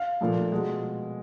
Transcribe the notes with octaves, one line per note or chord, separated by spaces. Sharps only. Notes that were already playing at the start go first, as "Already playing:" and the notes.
Already playing: F5
A#2 F3 A3
B2 G#3